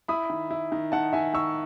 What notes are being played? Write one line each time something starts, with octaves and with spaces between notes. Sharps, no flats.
E4 B5 D#6
D#3
E4
D#3
D#3 F#5 A5
D#3 E5 G#5
D#3 C#6 E6